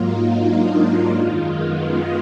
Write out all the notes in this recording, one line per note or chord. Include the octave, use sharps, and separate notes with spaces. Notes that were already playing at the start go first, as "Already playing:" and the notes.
Already playing: G#2 F#3 A#3 D#4 F4
D4
F4
F#2 D#3 G#3
B3